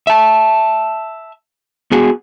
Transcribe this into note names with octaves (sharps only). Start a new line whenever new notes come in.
E5 A5
B3 F#4 G#4 G#5